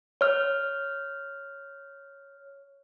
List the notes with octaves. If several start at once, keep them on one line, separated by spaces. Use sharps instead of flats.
C#5 F6